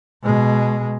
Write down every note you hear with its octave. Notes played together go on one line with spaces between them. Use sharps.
B2 G#3